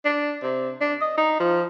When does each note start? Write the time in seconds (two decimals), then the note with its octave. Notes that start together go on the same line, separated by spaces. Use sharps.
0.05 D4
0.43 C3
0.81 D4
1.01 D#5
1.18 D#4
1.40 F3